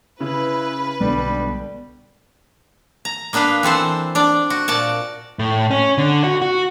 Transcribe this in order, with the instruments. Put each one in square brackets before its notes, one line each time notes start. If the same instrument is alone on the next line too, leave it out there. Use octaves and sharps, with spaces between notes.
[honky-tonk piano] C#3 [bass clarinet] E4 [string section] B4
[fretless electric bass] B1 G#3 B3 [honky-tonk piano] B2 D3 [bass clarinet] G3
[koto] A#5
A#3 B3 D4 B4 F5
E3 C4 A4 C5
D4 D5
F#4
A#2 D5 F#5 A5
[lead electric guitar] A2
C#4
D3
F#4
F#4